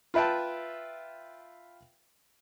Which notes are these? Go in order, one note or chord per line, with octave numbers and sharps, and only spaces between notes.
F4 B4 E5 G5 A5